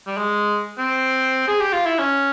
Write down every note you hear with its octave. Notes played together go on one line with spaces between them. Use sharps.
G3
G#3
C4
G#4
G4
F4
E4
C#4